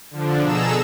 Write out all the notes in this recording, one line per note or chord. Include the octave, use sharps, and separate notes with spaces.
D3 F3 D4
B2 G#4 A4 A#5 E6 E7